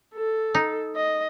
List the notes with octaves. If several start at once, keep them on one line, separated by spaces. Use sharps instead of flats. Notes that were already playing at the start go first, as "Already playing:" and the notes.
A4
D#4
D#5